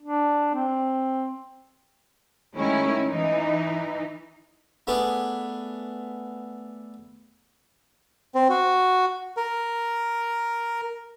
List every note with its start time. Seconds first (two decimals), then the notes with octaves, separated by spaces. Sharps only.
0.03 D4
0.54 C4
2.56 D#3 G#3 A3 C#4 E4 C#5
3.09 E3 D#4
4.87 A3 B3 D4 G#4
8.35 C4
8.50 F#4
9.37 A#4